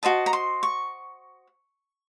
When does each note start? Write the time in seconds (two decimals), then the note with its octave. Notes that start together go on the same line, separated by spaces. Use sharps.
0.03 F#4 C5 D#5 A5
0.26 A#5
0.33 C6
0.63 C#6